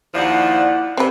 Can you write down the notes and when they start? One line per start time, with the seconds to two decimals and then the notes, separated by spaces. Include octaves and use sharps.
0.14 D#2 F3 E4 D5 F#5
0.97 C3 C4 B4